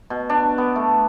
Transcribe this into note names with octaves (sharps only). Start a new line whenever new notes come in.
B2
D4
B3
A3